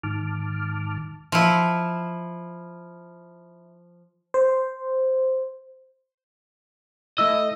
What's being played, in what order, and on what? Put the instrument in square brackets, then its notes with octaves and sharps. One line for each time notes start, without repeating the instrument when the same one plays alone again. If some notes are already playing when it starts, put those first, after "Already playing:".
[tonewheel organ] G#2 D#3 A5 D6 F6
[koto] F3 E4
[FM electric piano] C5
[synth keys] A3 E4 [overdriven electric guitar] D#5 [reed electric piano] E6